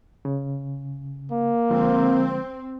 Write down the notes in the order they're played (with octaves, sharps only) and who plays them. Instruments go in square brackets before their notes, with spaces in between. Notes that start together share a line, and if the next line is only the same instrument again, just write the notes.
[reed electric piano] C#3
[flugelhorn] A#3
[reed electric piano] D3 F3 G#3 [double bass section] C4